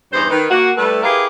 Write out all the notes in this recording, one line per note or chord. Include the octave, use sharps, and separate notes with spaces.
E2 G2 D#4 C5
D#3 B4
A#3 F#4
G3 A3 E4 A4 B4
E4 G4 G#4 A#4 B4 F5